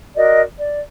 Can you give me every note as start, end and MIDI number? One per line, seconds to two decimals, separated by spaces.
0.15 0.42 66
0.15 0.42 70
0.15 0.42 74
0.15 0.42 75
0.58 0.80 74